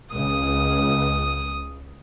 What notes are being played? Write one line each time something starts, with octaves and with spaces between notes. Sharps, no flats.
C#2 C#3 D#6